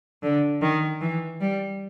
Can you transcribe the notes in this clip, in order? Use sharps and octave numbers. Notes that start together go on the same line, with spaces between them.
D3
D#3
E3
G3